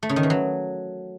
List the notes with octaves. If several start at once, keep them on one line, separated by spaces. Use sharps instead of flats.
A3
C#3
D#3
E3
F#3